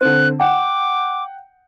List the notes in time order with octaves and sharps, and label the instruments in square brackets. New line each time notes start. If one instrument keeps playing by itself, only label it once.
[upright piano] D3 C4 [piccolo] F#6
[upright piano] F#5 G5 [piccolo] D6